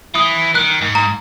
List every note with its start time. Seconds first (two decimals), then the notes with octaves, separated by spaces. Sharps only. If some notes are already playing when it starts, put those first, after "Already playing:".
0.15 E3 D#6
0.55 D#3 F#6
0.81 G#2
0.95 A#5